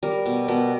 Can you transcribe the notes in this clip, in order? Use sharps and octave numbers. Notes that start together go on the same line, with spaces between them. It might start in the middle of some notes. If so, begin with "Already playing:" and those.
G3 A#4
B2
B2 A#4